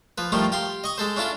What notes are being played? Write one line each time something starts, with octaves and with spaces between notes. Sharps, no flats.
F3 B4
A2 D#3 F3 G3 A3 F4
G4 F5 C6
D#5 C#6 D#6
G#3 A4 C5
C#4 D4 E4 F4 A4